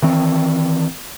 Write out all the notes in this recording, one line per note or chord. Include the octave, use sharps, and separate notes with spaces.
D#3 E3 C4